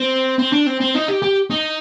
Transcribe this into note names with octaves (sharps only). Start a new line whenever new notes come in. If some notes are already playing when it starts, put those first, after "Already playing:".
Already playing: C4
C4
D4
C4
C4
D#4
G4
G4
D#4